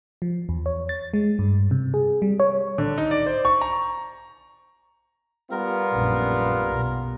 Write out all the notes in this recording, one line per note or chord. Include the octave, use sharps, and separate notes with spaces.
F3
E2
C#5
A6
G#3
G2
C3
G#4
G3
C#5
D3
D#4
D5
C5
C#6
A#5
G3 B3 F4 A#4
A#1 F#2
B1